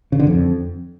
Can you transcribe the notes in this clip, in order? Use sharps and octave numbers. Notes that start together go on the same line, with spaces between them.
C#3
D3
F2